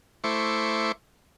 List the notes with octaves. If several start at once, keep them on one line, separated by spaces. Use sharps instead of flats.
A3 E4 C5 C#6 D6